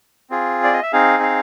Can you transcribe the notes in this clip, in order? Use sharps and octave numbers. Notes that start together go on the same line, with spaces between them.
C4 F4 G#4
D5
D#5
E5
C4 D#4 G#4 F5
F5